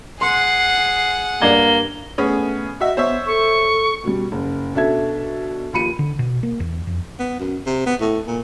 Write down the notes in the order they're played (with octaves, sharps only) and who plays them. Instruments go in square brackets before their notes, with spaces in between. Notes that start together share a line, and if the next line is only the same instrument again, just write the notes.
[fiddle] G#4 F#5 [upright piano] C6 [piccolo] C7
[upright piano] G2 D5 G#6 [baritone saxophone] A#3 [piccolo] G7
[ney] A3 [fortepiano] B3 C#4 G#4
[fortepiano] F#4 E5 [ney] D#5
[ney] B3 [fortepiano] C5 C#5 E5
[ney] A4 [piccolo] C#6
[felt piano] B2 G3
F#1
B2 D4 A4 E5 G#6
D#2 F3 B5 C#7 D#7
[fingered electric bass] D3
B2
A#3
E2
F2
[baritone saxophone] B3
F#2
C3
B3
A2
A#2